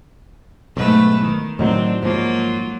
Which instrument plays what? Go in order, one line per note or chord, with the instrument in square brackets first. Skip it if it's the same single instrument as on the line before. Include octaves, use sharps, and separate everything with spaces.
[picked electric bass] B1 G#2 [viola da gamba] A3 B4
[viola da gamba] D#3
[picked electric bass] A2 D#3 F#3 [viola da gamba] C4 D4
[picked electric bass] G#2 F3 [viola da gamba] F#3 A#3 F4